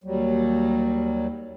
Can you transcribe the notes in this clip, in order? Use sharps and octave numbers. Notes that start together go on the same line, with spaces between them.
D#2 F#3 G3